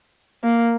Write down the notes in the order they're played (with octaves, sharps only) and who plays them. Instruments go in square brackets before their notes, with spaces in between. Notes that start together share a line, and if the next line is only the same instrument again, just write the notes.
[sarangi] A#3